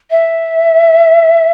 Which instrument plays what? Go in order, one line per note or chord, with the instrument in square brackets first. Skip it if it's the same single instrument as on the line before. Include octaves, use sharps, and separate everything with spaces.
[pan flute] E5